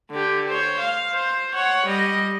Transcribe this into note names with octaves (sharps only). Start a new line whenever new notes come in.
D3 G4
C5 C#5
F5
C5
C#5 F#5
G3 D#5